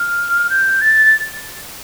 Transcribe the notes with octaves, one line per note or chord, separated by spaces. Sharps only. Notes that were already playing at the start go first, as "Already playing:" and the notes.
Already playing: F6
G6
A6